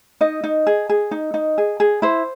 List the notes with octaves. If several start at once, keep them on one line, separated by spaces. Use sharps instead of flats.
D#4 D#5
D#4
G#4
G#4
D#4
D#4
G#4
G#4
E4 C5